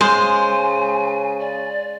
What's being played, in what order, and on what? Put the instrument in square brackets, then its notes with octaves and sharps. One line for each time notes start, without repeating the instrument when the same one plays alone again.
[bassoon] C#3 [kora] G#3 F5 [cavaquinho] C5 [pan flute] G#5
[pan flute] D5